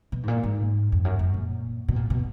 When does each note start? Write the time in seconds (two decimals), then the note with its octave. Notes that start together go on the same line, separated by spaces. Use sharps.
0.12 B2
0.23 G#2
0.28 A#2
0.43 G#2
0.92 F2
1.05 F#2
1.19 F#2
1.34 A#2
1.88 B2
1.96 A#2
2.10 B2